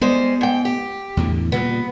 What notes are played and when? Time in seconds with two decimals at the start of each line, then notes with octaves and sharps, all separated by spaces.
0.01 G3 G#3 B3 C5
0.41 G#2 G5
0.65 G4
1.17 E2 A2 D3
1.52 A#2 C#3 G3 B3